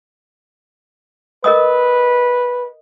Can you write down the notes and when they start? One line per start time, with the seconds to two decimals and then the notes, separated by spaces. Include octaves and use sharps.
1.44 A#4 B4 D#5 D#6